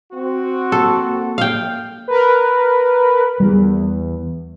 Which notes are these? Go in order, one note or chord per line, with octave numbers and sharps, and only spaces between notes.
C4 F#4
A#3 A4
F5 G5
A#4 B4
E2 G3